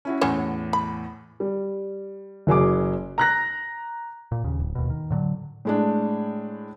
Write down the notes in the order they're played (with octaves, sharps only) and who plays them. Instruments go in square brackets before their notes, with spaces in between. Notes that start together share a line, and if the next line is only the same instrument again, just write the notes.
[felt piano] C#4 E4 F#4
[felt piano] E2 A2 E7 [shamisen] F#3 C#4 C#5
[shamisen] B5
[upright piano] G3
F#1 F#3 G#4 D6
A#5 F#6 A#6
[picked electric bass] A#2
D#2 C#3
D1
D#2 B2
D#3
A2 D3 F#3
[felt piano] A2 G#3 D4